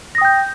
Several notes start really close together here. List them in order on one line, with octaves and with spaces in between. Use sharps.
A#6 D#6 G5 G6